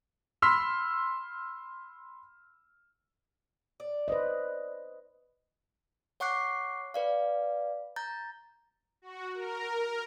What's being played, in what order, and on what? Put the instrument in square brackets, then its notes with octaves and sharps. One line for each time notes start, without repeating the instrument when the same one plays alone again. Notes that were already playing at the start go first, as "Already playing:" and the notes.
[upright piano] B5 C6 E6 F6 B6
[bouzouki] D5
[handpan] B4 C5 D#5
[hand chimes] C#5 F#5 C#6 D6 F#6 C7
B4 D5 F5
A#5 G6 A6
[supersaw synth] F#4
A#4